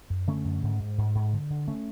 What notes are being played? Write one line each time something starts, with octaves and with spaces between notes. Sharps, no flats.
F#2
D3 A3 C#4
F#2
G#2
G#2
G#2
G#2
D3
D3
A3 C#4